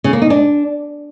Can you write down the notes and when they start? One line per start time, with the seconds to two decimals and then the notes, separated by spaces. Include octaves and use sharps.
0.04 C#3
0.13 A#3
0.22 D#4
0.30 D4